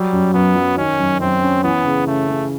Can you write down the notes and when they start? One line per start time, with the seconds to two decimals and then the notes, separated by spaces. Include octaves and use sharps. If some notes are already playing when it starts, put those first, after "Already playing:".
Already playing: F#3 G3
0.12 F#2
0.34 F#2 B3
0.56 F#3
0.77 D#3 C#4
0.99 F#2
1.21 F#2 C4
1.42 C#4
1.64 E3 B3
1.85 C#3
2.07 C#3 A3
2.28 C#3